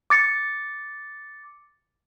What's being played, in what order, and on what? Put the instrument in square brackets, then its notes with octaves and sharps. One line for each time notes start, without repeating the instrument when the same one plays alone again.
[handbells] D6 A6 C#7